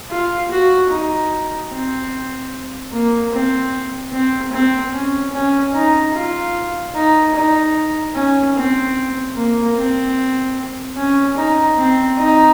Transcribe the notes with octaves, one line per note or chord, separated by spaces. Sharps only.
F4
F#4
D#4
C4
A#3
C4
C4
C4
C#4
C#4
D#4
F4
D#4
D#4
C#4
C4
A#3
C4
C#4
D#4
C4
D#4